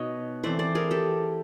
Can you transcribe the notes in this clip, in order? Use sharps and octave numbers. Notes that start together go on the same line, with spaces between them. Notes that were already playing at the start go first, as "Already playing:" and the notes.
Already playing: B2 D#4 C#5 D#5
E3 A3 C4 C5 D5
C5 D5
G#4 A#4
G4 A4